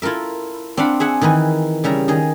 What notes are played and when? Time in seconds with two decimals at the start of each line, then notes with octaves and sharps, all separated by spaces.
0.02 E4 F4 A4 A#4 E5
0.77 C4 D4 F5 F#5 B5
1.00 G#4 E5 F#5 G#5
1.21 D#3 E3 D#4 B4 G#5
1.84 C#3 G3 E5 A#5
2.08 D#3 G#4 D#5